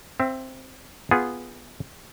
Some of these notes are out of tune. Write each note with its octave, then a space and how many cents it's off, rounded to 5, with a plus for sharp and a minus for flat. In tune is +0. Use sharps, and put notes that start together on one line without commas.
C4 +0 E5 +25
B3 +0 F4 +0 G#4 -5